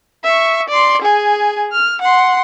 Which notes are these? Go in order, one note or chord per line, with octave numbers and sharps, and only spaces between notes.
E5 C#6
D5 C6
G#4 G#5
F6
F#5 C6